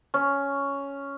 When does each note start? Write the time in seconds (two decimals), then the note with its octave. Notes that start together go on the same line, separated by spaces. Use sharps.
0.14 C#4